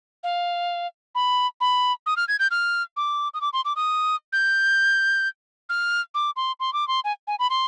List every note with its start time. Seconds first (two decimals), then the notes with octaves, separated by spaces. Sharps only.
0.24 F5
1.15 B5
1.61 B5
2.06 D#6
2.17 F6
2.28 G#6
2.39 G6
2.51 F6
2.97 D6
3.34 D#6
3.41 D6
3.53 C6
3.65 D6
3.76 D#6
4.33 G6
5.69 F6
6.15 D6
6.36 C6
6.60 C6
6.73 D6
6.88 C6
7.04 G#5
7.27 G#5
7.39 B5
7.50 C6